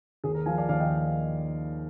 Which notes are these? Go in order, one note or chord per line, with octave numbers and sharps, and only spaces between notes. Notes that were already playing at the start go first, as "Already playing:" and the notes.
D#2 G#4
A#4
F3 F5 G#5
D5 F5
D#2 D5 F5
D#5 G5